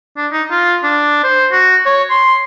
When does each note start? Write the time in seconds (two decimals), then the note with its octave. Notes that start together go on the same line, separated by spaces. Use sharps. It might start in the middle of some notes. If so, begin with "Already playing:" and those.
0.17 D4
0.32 D#4
0.51 F4
0.83 D4
1.24 C5
1.52 F#4
1.86 C#5
2.10 C6